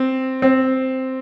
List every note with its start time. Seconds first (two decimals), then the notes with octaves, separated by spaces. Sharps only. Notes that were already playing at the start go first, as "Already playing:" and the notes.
Already playing: C4
0.42 C4